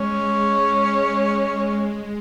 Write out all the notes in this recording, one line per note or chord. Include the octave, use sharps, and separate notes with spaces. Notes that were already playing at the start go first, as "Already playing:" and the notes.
Already playing: G#3 C#4
G#3